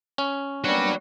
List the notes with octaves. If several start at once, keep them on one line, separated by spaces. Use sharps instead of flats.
C#4
G3 A#3 B3 D4 F#4 C#5